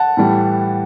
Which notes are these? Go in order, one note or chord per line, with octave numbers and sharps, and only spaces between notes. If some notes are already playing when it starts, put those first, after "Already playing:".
Already playing: F#5 A5
A2 E3 G3